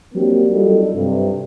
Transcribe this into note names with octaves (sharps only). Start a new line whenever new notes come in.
F#3 A#3 C4 D4 G4
F#3 G3 D#4 F4 A4
G2 C3